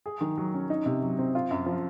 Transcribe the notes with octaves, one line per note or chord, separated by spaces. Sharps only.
G#4
D#3
F#3
C#4
D#4
C3
F#3
C4
F4
F#2
F3